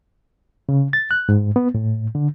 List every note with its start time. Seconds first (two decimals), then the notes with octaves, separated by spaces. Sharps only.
0.69 C#3
0.93 A6
1.11 F#6
1.29 G#2
1.56 B3
1.75 A2
2.15 D3